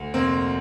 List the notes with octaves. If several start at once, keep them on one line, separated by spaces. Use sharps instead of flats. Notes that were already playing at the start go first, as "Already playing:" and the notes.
Already playing: D2
F1 A#3 C4